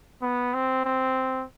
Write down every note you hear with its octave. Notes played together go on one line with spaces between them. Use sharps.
B3
C4
C4